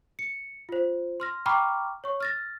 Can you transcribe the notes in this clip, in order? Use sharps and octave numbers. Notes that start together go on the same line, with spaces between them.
C#7
F4 C5
C6 F6 A#6
G5 A#5 B5 C#6 D6 F6
C#5 C#6
F6 A6 A#6